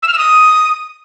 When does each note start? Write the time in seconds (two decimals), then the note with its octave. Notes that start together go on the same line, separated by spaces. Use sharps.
0.03 E6
0.08 F6
0.13 E6
0.18 D#6